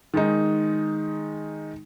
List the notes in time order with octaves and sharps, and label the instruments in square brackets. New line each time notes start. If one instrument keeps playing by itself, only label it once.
[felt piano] D#3 G#3 D#4